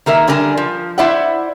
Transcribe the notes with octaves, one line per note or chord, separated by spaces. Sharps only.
D#3 A#3 A#4 E5
D3 G3 D4 A#4 G#5
F3
E4 C5 D5 E5 F#5